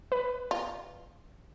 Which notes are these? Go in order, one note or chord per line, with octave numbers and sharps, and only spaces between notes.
B4
F4